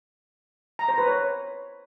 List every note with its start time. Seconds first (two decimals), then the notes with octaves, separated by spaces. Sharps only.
0.79 A#5
0.89 C5
0.98 B4
1.07 C#5